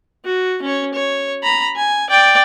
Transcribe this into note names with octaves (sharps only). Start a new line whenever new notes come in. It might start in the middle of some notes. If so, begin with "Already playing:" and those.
F#4
C#4 C#5
C#5
A#5 B5
G#5
D5 G5